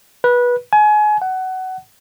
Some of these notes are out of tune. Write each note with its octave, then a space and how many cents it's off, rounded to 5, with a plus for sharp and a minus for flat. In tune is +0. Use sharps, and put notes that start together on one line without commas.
B4 -20
G#5 +30
F#5 +20